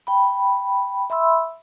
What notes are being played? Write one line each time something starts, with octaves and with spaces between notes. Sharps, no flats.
G5 B5
E5 B5 C6 E6